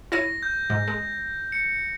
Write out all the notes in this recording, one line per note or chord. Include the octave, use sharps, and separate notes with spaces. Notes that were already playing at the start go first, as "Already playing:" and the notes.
E4 C#5 A#6 D#7
G6
G#2
G#3
C#7